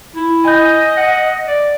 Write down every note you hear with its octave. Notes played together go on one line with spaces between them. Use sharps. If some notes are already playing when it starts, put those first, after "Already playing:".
E4
D#5 G#5 G6
F#5
D5